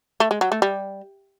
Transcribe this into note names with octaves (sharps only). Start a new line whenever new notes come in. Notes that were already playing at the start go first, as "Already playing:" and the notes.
A3
G#3
F#3
A3
G3